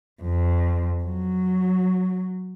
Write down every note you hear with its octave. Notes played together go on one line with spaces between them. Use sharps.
F2
F#3